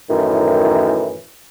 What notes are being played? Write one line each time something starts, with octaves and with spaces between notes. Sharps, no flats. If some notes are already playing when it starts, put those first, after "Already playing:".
F#2 A2 D#3 E3